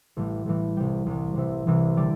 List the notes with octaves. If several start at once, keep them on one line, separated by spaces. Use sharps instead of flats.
A1 A2 E3 G3
A1 A2 E3 G3
C2 C3 G3 G5
C2 C3 G3
C2 C3 E3 G3 E5
C2 C3 E3 G3
D3 G3 D5